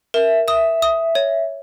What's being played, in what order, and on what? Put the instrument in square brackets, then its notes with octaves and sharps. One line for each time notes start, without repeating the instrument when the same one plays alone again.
[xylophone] A#4 [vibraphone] E5
[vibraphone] E5 [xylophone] D#6
[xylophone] D#6
C#5